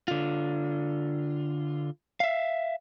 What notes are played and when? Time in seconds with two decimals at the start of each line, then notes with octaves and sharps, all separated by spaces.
0.08 D3 F4
2.20 E5 F5